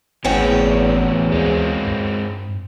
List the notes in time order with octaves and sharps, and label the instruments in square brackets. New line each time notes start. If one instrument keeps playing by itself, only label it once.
[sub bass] G#1 [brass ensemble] E2 [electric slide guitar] A2 E3 C4 [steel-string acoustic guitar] C#4 F#4 G5
[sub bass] D2 [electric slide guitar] G#3 C4 F4
[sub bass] G2